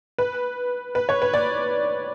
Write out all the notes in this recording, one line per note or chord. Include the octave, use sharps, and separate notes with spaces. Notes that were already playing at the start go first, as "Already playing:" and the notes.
B4
B4
C#5
B4
D5